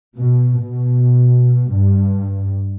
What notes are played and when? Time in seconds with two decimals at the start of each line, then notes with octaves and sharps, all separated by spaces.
0.18 B2
0.62 B2
1.72 G2